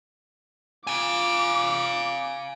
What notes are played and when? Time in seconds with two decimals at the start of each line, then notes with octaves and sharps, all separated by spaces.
0.87 F4 F5 G#5 D6